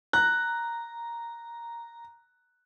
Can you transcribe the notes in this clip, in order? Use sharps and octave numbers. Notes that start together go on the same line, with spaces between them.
A#5 F#6